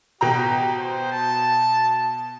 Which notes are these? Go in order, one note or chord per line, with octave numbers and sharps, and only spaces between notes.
B2 G4 G5 A#5
C5
A5